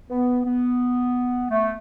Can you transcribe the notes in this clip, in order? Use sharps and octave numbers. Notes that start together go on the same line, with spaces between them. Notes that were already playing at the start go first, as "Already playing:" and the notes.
B3
B3
A3